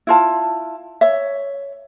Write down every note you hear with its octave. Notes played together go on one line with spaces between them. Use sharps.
E4 F4 A5
C#5 E5